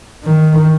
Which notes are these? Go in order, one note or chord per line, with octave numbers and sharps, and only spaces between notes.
D#3